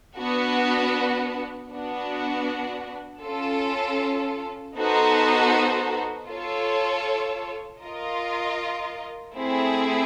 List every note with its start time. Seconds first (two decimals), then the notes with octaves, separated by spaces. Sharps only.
0.17 B3 D4 F#4
1.71 B3 D4 F#4
3.23 C#4 F4 A4
4.76 B3 D#4 F#4 A4 C5
6.28 F4 A4 C#5
7.81 F4 A#4 D#5
9.33 A3 C4 E4 G#4